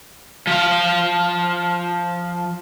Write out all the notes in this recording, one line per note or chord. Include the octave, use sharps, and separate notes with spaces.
F3 F5